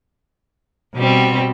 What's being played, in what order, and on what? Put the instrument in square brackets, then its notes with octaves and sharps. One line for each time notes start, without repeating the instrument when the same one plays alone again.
[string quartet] B2 G3 C4